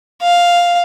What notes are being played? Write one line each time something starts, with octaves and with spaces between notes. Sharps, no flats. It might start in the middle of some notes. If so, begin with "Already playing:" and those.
F5